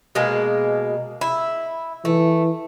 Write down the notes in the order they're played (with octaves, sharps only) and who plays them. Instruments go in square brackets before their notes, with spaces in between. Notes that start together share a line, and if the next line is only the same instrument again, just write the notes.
[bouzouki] B2 G#3 A#3
E4
[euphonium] E3 [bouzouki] A3